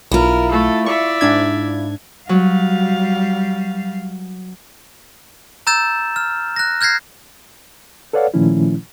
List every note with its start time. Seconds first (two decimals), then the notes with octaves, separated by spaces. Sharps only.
0.11 B1 E4 F4 A#4
0.51 A3 A4
0.86 D5 E5 C#6
1.21 G#2 D4 G#6
2.29 F#3 G3 F5
5.67 A#5 E6 G6 A6 E7
6.16 F6
6.56 F#6 A#6
6.81 F6 G6 G#6 A#6 C7
8.13 A4 B4 C#5 D5 F5 F#5
8.34 A#2 D#3 F3 A3 C#4 E4